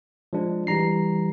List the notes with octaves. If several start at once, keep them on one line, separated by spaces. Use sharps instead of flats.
F3 G#3 D4
E3 G3 A#5 C7